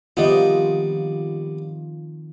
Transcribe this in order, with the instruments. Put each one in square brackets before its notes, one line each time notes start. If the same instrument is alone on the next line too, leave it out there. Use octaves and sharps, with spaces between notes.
[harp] D#3 F3 C4 [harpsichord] G3 B3 [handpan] F4 D#5 E5